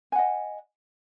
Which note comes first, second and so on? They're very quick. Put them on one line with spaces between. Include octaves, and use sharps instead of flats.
G#5 F#5 D#5